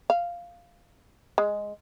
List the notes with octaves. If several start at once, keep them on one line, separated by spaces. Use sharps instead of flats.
F5
G#3